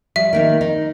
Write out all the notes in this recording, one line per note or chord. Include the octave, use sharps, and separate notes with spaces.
G3 E5
D#3 A#3 D#4
D#4